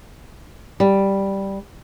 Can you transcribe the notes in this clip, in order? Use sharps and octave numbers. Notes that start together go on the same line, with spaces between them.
G3